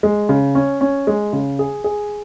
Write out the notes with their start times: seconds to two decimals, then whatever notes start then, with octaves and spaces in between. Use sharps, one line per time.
0.03 G#3
0.29 C#3
0.55 C#4
0.81 C#4
1.07 G#3
1.33 C#3
1.59 G#4
1.84 G#4